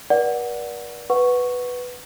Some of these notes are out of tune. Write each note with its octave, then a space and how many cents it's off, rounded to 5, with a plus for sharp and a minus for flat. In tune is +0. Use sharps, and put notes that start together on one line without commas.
B4 -45 D5 -10 F#5 +0
B4 +0 F#5 +0 C#6 +0